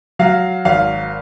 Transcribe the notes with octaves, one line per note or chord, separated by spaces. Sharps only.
F#3 F5
G#1 F5